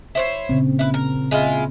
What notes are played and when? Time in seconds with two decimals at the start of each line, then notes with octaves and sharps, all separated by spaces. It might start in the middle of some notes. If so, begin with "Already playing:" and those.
0.15 E4 C5 C#5
0.49 A#2 C#3 C4
0.79 E4 B4
0.94 A#4
1.31 G#3 E4 F4